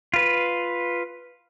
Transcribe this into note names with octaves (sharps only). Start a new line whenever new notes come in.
F4 B4